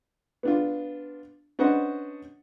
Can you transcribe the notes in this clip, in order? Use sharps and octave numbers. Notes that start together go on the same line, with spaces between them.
B3 D4 F4
C#4 D4 B4 C5 D#5 F#5